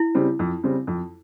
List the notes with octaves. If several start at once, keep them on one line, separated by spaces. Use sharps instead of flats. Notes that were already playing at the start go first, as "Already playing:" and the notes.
Already playing: E4
C#3 G3 C4
F2
C#3 G3 C4
F2